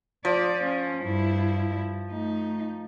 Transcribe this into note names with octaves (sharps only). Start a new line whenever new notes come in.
F3 D5
C#4
G2 E4
A3 D#4